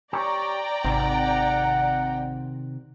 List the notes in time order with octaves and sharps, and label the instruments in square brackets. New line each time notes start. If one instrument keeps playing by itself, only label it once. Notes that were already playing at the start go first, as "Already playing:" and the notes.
[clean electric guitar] G4 C#5 [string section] D5 G5 A#5
[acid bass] G#1 [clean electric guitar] C3 D#3 C4 [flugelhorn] F#5